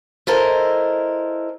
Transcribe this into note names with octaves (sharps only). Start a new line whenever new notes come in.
E4 A4 A#4 C5 D#5